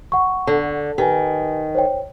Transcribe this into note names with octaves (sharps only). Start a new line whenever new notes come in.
F#5 C#6
D3
D#3 G4 B4 G#5
C5 C#5 G5